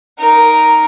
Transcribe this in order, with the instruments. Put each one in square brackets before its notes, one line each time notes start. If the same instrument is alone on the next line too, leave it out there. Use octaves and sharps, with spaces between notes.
[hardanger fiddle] D#4 A#4